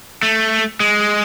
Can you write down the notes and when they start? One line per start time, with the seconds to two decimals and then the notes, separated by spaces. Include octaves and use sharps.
0.23 A3
0.80 G#3